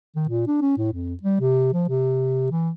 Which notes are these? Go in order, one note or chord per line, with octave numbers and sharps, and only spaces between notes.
D#3
A#2
D4
C#4
A2
F2
G3
C3
F3
C3
E3